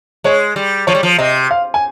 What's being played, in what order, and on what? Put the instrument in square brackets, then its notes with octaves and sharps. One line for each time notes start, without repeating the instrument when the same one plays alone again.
[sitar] G#3 [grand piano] C#5
[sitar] G3
[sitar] F3 [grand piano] C#5
[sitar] G3
F3
[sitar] C3 [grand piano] D#5
[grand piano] F5
G#5